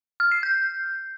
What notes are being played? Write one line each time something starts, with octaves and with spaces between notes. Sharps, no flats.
F6
C7
G6